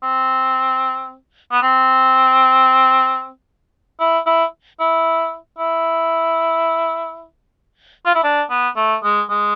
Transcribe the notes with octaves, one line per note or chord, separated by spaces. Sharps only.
C4
B3
C4
E4
E4
E4
E4
F4
E4
D4
B3
A3
G#3
G#3